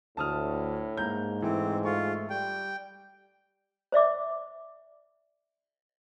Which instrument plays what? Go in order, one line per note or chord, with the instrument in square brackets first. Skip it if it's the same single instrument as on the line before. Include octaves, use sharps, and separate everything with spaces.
[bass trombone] D2 [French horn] A2 [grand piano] A5 D#6 F6
[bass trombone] G#2 [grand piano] A#3 A#5 G6
[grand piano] E3 [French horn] A3 [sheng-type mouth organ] C4
[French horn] A3 [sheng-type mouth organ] F4 [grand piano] C#6
[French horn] G3 [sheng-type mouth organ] G5
[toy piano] C5 D5 E5 D6